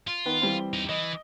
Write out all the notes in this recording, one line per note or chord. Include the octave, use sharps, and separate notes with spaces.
F4
D#3 B3
E3 G3 C4
D#4 G4
E3 D#5